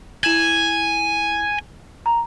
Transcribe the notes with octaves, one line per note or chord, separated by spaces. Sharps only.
E4 G#5 E7 F#7
A#5